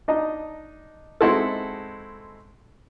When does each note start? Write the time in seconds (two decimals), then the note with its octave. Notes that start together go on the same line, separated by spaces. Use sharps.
0.08 D4 D#4 D#5 A#5
1.21 G#3 C4 D#4 E4 F#4 A4